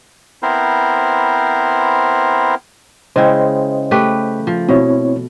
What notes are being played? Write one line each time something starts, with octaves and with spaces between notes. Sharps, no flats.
B3 C4 E4 A#4 C5
C#3 G#3 E4 C5 D#5 G5
A3 G4 B4
F3
B2 C4 E4 C#5